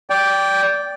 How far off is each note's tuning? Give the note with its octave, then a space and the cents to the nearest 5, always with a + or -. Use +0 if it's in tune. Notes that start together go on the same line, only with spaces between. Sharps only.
D5 -15 G5 +0